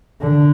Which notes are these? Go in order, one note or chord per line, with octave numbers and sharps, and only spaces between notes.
D3